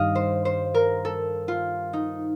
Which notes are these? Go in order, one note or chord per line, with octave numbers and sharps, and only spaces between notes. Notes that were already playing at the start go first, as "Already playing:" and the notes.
Already playing: G2 D#3 G3 D#5 F5
C5
C5
A#4
A4
F4
D#4